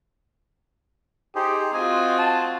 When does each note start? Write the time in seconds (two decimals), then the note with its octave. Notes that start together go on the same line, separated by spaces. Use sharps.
1.35 D#4 G4 G#4 C5
1.74 C4 F4 F#4 D#5 G#5
2.18 A5